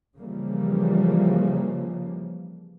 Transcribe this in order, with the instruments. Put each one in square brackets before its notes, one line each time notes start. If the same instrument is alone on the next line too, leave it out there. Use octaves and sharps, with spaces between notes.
[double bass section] C#3 E3 F3 G3 A#3